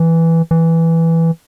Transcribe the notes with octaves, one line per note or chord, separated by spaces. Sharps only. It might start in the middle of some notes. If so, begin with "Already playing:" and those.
Already playing: E3
E3